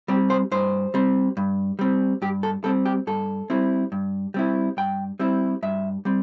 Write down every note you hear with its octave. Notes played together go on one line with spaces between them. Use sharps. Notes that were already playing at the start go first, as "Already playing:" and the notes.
G3 C4 G4
C5
G2 C5
G3 C4
G2
G3 C4
G2 G4
A4
G3 C4 A4
G4
G2 A4
G3 C4 E4
G2
G3 C4 E4
G2 G5
G3 C4 E4
G2 E5
G3 C4